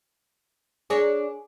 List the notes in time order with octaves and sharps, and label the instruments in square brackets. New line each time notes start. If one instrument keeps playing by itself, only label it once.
[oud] D4 A#4 C#5 [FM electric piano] G#4